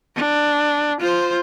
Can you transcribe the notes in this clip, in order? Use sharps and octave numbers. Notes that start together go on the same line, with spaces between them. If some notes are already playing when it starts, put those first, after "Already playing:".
D4
F4 C5